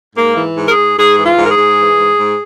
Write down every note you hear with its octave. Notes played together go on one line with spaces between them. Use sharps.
G#2 A#3
E3
G#2
A#4
G#4
G#2
G#2 G#4
E3
F4
G#2
A#4
G#4
G#2
E3
G#2
G#2